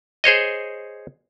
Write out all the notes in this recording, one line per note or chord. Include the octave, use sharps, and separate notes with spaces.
G#4 C5 C#5 D#5